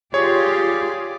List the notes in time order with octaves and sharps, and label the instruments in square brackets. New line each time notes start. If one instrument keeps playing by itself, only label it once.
[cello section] F4 G4 [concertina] G#4 [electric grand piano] C#5 [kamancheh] D5